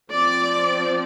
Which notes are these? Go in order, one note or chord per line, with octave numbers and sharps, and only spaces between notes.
F3 C4 D5